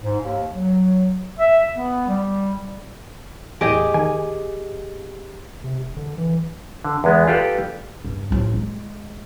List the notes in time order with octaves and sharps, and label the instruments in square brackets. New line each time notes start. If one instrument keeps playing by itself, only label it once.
[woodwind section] G#2
D#2
F#3
E5
B3
G3
[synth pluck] E2 A2 [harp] G4 G#4 D#5
[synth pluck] D#3 G#5
[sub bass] C3
E1
D3
E3
[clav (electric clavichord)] D3
E2 G#3 B3
F4 G4 A4 B4 D5
[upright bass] G2
A1 F3
G#3